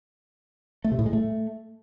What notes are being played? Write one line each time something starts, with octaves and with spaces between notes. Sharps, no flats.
A3
C3
A2
G#3
A3